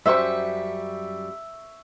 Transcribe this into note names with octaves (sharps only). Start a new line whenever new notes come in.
F#2 G3 C5 E5 C#6